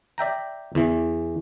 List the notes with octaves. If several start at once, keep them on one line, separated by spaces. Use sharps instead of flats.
D5 E5 G5 A#5
E2 E3